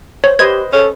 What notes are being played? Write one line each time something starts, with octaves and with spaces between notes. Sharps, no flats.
C5 C#5
G4 B4 C5 D#5 G#6
C#4 A4